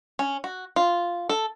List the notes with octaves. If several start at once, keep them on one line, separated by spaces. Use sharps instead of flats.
C#4
F#4
F4
A4